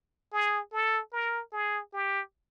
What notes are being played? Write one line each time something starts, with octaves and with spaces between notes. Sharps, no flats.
G#4
A4
A#4
G#4
G4